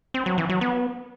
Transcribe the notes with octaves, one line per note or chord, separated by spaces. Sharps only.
C4
F#3
E3
F#3
B3